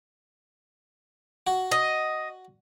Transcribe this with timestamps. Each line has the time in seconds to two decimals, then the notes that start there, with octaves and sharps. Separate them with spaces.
1.47 F#4
1.71 D#5